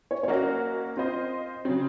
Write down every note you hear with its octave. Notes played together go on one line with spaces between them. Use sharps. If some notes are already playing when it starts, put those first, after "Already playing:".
C#5
C#5
A#3 C#4 F#4 A#4 D#5
C4 F4 C5 D#5
C#3 F#3 C4